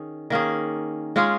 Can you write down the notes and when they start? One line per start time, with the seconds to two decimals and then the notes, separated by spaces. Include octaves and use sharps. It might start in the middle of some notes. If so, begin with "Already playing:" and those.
Already playing: D#3 C#4 G#4
0.30 D#3 A#3 C#4 G#4
1.16 G#3 C#4 F4 G#4